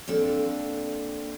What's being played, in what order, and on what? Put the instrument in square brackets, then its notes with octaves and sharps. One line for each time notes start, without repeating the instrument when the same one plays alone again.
[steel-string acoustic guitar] A#3 C4 D4 A4